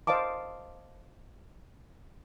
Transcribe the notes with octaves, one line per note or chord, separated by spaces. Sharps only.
C5 D#5 F5 A5 D6